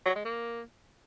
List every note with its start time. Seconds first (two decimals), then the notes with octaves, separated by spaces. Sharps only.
0.06 F#3
0.15 G#3
0.25 A#3